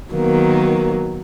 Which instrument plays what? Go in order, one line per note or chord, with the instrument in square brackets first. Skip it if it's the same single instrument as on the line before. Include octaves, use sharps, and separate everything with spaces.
[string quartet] D#3 F#3 A#3 B3